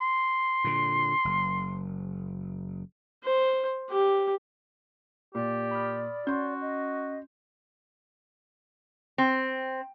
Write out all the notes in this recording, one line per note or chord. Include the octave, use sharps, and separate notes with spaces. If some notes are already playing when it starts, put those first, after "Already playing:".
C6
A#2 D3
F#1
C5
G4
A#2 G4 D5
B5 D#6 F6
C#4 F#4 C6 G6
D#5
C4